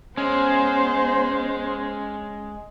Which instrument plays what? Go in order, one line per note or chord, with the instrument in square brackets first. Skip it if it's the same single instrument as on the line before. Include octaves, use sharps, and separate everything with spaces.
[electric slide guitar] G#3 [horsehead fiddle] B3 C5 [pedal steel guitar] C#4